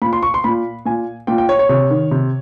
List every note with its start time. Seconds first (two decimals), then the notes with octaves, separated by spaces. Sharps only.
0.02 A#2 B5
0.13 C6
0.23 C#6
0.34 C6
0.44 A#2 B5
0.86 A#2 G#5
1.27 A#2 G5
1.38 G5
1.49 C#5
1.59 C#5
1.69 C3 C#5
1.90 D#3
2.11 C3